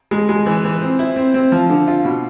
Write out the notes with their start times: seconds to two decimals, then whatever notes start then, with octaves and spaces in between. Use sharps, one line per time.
0.11 G#3
0.29 G#3
0.46 E3
0.64 E3
0.82 C4
0.99 E4
1.16 C4
1.34 C4
1.52 F3
1.70 D3
1.88 F4
2.05 B2